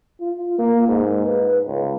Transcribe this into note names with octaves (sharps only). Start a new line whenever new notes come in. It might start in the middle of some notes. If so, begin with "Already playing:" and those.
F4
A#3
G#2
B4
C#2